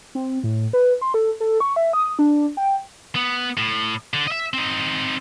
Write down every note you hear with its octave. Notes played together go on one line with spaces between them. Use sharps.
C4
A2
B4
C6
A4
A4
C#6
E5
D#6
D4
G5
B3
A2
D3
D#5 E5
C4 D#4